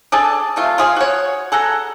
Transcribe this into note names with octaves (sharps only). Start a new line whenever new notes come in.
D4 G#4 A4 A5
C3 A3 F4
F4 G#4 E5 F5
F#4 C#5
G#4 A4 F#5 A#5